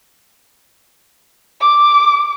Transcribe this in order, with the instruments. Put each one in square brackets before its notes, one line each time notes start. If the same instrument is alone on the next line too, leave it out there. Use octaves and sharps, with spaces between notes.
[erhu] D6